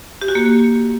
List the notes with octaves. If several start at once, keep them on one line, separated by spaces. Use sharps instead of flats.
G4
F#4
A#3